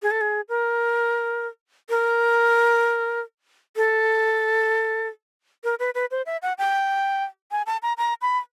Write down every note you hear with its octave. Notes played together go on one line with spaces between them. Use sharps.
G#4
A4
G#4
A#4
A#4
A4
A#4
B4
B4
C5
E5
F#5
G5
G#5
A5
A#5
A#5
B5